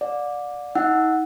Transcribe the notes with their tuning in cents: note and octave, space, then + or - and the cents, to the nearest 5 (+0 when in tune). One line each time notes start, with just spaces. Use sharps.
D5 +0 F#5 -45
D#4 +40 F#5 +0 E6 -10